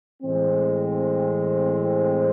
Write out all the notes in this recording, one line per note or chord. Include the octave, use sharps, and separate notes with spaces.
A2 E3 G#3 C4